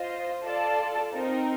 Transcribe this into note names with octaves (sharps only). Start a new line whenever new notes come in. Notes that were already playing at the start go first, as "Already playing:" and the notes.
Already playing: F4 C5 D#5
F4 A4 D5 A5
C4 D#4 A#4